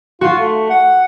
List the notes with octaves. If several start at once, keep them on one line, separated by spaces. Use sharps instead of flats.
F4 F#4
A3
F#5